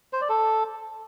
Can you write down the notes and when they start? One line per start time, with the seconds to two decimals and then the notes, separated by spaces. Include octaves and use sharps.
0.13 C5
0.21 D5
0.29 A4